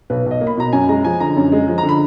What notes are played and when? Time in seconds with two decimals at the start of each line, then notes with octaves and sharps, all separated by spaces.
0.10 B1 B4
0.26 B1
0.31 D#5
0.41 A#3
0.47 B5
0.57 B2 A#5
0.73 F#2 G#5
0.89 G#3 A#5
1.04 F3 G#5
1.20 D3 A#5
1.37 F#2
1.52 G#3
1.67 F3
1.78 A#5
1.83 D3
1.89 B5